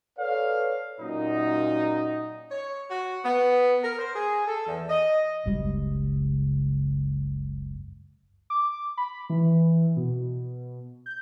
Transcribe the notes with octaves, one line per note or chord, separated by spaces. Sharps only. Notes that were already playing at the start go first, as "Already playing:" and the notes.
A4 B4 C#5 D5 F5
F#2 A#2 D#4
C#5
F#4
B3
A#4
C5
G#4
A4
E2
D#5
F#1 C#2 F#2 G3
D6
B5
E3
B2
G6